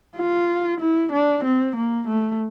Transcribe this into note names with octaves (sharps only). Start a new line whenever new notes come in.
F4
E4
D4
C4
A#3
A3